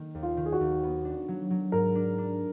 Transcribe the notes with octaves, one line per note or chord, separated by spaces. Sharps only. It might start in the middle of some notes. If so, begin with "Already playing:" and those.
Already playing: D#3 A#3
D#2
F4
D#3
G#4
F#4
D#2
B3
D4
F#3
F#3
G#2 A#4
D4
D4